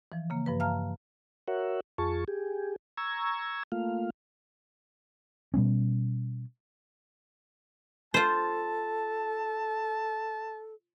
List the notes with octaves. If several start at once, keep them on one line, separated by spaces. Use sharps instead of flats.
E3 F3
C#3 A#3
G2 F3 B4
E5 F5 A5 A#5 F6
F#4 A#4 C#5 E5 F#5
F2 F4 G#4 A5 C#6
G4 G#4
A#5 C#6 E6 G#6
A3 A#3 F4 F5
B2 G3 B3 C#4
F4 A4 C5 A5